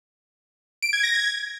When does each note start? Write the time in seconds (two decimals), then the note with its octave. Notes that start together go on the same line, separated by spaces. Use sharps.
0.82 D7
0.93 G#6
1.03 A#6
1.14 G#6